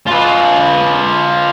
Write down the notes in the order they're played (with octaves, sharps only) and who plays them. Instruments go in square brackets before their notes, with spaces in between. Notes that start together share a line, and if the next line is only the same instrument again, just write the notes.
[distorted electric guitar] F4 B4